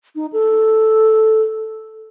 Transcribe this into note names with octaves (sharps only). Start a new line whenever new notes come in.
D#4
A4